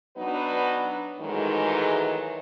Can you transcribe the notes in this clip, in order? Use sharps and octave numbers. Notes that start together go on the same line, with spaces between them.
F#3 B3 D4 D#4 B4
G#2 D#3 E3 F#3 G#3 A3